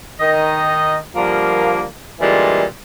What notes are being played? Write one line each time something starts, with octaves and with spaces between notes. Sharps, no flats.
D#3 D#5
D3 F3 G3 A#3
A#2 D3 E3 G3 G#3 F4